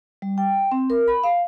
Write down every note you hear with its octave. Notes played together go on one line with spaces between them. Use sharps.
G3
G5
C4
A#4
B5
F5